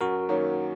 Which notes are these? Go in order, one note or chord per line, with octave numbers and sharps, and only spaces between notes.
F#2 F#4 A#4
D#3 F#3 A#3 C#4